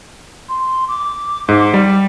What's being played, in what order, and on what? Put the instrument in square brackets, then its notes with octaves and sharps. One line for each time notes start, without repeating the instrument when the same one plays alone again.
[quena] C6
D6
[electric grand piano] G#2
G3